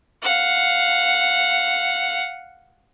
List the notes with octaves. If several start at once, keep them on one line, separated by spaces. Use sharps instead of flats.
F5 F#5